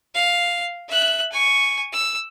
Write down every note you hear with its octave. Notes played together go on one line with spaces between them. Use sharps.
F5
E5 F#6
G#5 C#6
E6